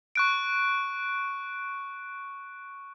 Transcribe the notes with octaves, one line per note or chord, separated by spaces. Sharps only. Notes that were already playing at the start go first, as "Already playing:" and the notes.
C#6 F#6 D7